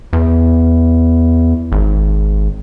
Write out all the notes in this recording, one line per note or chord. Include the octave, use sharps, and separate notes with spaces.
E2
G#1